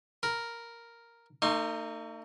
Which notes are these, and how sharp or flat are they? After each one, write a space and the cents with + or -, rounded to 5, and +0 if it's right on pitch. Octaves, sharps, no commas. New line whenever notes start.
A#4 +0 B5 +0
A3 +45 D#4 -15 C6 +35